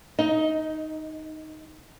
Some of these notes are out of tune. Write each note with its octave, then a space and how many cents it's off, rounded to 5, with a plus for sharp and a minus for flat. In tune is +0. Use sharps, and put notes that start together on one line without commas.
D#4 +0 D#5 +20